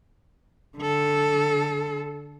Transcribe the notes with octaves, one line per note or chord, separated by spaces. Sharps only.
D3 A4